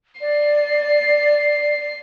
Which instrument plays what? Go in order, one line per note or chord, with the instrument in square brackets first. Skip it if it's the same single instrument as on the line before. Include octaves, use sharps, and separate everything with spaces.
[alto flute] D5 [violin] C7